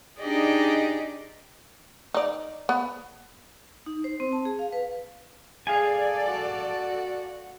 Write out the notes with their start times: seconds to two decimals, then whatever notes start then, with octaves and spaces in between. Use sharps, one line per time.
0.20 D4 D#4 G4 G#4 D5 D#5
2.14 D#4 D5
2.69 B3
3.86 D#4
4.04 C5
4.20 C4
4.32 A5
4.45 G#4
4.59 F5
4.73 B4
5.67 G#4 A4 D5 F5 G#5
6.26 F#4